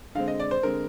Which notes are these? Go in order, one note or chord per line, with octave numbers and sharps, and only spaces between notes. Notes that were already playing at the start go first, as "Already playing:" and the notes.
D3 G#3 C4 F5
D#5
D5
C5
D3 G#3 C4 A#4